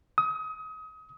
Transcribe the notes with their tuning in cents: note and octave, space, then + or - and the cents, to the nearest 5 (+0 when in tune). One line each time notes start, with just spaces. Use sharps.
D#6 +30